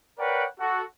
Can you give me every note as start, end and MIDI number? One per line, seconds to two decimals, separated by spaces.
0.19 0.45 70
0.19 0.45 71
0.19 0.45 73
0.19 0.45 74
0.19 0.45 78
0.19 0.45 79
0.60 0.82 66
0.60 0.82 69